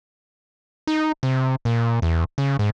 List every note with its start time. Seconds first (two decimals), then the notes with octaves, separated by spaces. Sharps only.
0.87 D#4
1.23 C3
1.65 A#2
2.02 E2
2.38 C#3
2.59 G#2